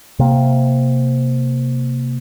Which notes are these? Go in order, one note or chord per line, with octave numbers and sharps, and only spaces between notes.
C3 A#3